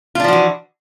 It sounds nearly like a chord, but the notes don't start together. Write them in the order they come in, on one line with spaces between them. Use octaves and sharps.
F4 D4 F3 F#4 E3